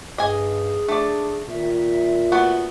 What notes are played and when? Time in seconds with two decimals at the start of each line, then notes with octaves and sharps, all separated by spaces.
0.18 G2 G#4 D#5 G#5
0.88 A3 D4 D5
1.49 A#2 D#3 E5
2.32 A3 B3 F#4